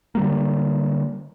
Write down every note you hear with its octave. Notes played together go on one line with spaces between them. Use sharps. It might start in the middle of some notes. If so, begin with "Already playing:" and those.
D3 G3 A#3